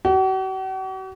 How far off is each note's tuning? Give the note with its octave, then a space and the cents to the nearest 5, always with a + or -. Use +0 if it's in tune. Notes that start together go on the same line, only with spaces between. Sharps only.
F#4 +45